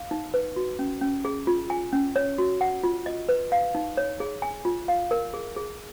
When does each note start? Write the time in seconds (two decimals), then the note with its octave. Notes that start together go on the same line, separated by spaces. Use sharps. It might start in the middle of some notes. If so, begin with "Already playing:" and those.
Already playing: F5
0.11 D#4
0.34 B4
0.56 F#4
0.79 C#4
1.01 C#4
1.25 G#4
1.47 F4
1.70 G#5
1.93 C#4
2.16 C#5
2.38 F#4
2.61 F#5
2.84 F4
3.06 D#5
3.29 B4
3.52 F5
3.75 D#4
3.97 C#5
4.20 G#4
4.42 G#5
4.65 F4
4.88 F5
5.11 A#4
5.34 G#4
5.57 G#4